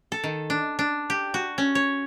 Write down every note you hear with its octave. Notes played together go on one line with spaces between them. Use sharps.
A4
D#3
D4
D4
G4
F#4
C#4
C#5